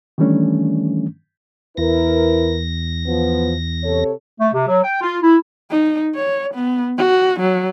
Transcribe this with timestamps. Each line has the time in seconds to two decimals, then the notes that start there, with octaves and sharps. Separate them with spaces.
0.18 D#3 E3 G3 A3 C#4 D4
1.77 E2 E4 A#4 B4 A#6
3.06 F3 B3
3.83 C3 A4 C#5
4.40 A3
4.53 C3
4.67 F#3
4.83 G5
5.01 F4
5.22 E4
5.70 D#4
6.15 C#5
6.54 B3
6.98 F#4
7.40 F#3